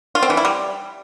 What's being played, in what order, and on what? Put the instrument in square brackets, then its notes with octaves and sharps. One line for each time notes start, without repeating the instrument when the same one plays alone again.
[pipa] F4
C4
E3
E4
G3